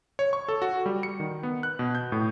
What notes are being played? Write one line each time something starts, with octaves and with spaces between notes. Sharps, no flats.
C#5
C#6
A4
F#4
G3
C#7
D#3
B3
F#6
B2
G6
A2